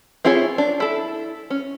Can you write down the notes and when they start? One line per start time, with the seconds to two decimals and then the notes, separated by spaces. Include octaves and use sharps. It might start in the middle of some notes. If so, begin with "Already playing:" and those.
0.25 C4 E4 F4 G#4 C#5
0.58 D4
0.80 E4 A4
1.50 C#4